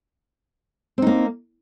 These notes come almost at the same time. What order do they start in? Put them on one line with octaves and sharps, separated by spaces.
C4 D#4 A#3